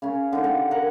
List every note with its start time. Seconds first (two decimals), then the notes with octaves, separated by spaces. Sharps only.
0.02 C#3 C#4
0.33 D3 D#4
0.44 D4 G4 F5 F#5
0.70 A#4 F#5 A#5